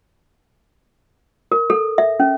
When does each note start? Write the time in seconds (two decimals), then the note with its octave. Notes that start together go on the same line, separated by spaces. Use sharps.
1.52 A#4
1.70 A4
1.98 E5
2.20 C#4